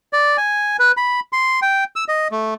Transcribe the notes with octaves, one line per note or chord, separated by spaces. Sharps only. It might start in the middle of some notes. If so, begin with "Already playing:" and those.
D5
G#5
B4
B5
C6
G5
E6
D#5
A3